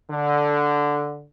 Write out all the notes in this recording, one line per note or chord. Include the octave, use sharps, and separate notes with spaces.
D3